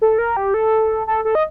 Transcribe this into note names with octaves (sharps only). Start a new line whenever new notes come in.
A4
A#4
G4
A4
A4
A4
D#5